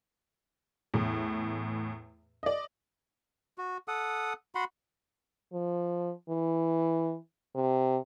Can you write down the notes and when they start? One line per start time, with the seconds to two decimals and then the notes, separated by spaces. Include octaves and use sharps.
0.94 E2 A2
2.43 D5 D#5
3.58 F#4
3.88 A4 F#5 D#6
4.55 F#4 F#5 B5 C6
5.52 F3
6.29 E3
7.55 C3